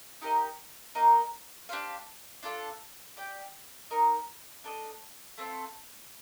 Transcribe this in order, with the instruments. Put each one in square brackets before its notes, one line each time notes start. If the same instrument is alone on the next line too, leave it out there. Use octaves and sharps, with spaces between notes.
[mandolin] D#4 G4 A#4 D#5
A#3 D#4 A#4 D#5
D4 G4 C5 F5
D4 F4 A4
G4 D5 G5
D#4 A#4 D#5
D4 A4 C5 D#5
A3 C4 F4 A4